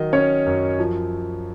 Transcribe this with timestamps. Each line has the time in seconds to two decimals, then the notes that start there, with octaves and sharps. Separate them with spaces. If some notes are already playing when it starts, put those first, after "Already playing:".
Already playing: D#3 F#3 D#5
0.13 C#4 C#5
0.46 F#2
0.79 F3